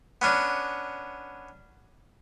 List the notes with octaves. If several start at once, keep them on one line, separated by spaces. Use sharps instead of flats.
B3 C#4 D4